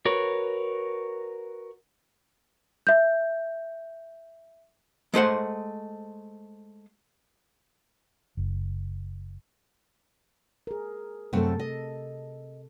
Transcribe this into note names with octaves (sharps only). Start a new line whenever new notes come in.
F#4 A#4 B4 C#5
E5 G6
G#3 A3 C5 F#5
F#1
G#4 A#4
F#2 C3 A3 C4 A4
D#5